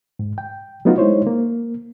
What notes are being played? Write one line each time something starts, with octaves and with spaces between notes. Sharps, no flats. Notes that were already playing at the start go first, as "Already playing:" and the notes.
G#2
G5
F#3 A3 B3 D#4 F4 F#4
G#3 D#4 E4 C5 C#5
A#3